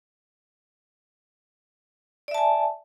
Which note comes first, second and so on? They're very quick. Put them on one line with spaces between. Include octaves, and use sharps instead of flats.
D5 E5 A5 G#5